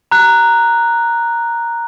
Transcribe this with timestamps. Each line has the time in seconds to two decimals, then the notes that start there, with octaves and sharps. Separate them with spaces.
0.11 A#5 F#6